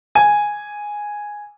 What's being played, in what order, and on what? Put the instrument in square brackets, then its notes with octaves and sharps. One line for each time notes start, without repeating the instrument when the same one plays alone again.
[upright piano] G#5